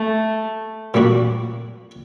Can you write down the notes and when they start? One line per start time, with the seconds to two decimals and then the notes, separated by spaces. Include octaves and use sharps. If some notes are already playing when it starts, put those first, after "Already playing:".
Already playing: A3
0.94 A#2 G3 A#3 D4 F#4